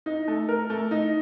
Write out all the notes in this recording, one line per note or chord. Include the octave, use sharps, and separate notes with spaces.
D#4
A3
A#4
A3
D#4